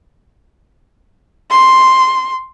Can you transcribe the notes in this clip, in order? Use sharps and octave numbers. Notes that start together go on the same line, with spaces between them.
C6